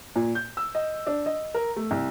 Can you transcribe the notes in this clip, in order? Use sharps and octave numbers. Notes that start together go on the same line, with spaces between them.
A#2
G6
E6
D#5
D4
D#5
A#4
A3
C2